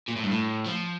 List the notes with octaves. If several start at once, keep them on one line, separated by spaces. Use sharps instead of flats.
A#2
A2
G2
A2
F3